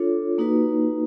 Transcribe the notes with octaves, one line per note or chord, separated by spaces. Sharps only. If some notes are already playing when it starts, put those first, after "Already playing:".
Already playing: D4 F4 A4 C#5
A#3 D#4 F#4 B4